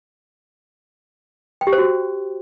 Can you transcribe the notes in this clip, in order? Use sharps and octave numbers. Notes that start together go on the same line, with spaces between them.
G5
G4
C5
F#4